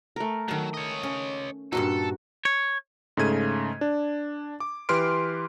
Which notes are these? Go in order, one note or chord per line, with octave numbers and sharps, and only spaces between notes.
A3 A#4
D#3 F#3 A5
C#5 D#5
C#4
G2 A#2 D#4 F#4 A4
C#5
G#2 C#3 A3 G#6 D#7
D4
D6
E3 G4 B4 C6 F6 D7